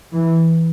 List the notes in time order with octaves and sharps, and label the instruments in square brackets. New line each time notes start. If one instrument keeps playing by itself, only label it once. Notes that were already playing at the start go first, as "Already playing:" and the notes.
[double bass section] E3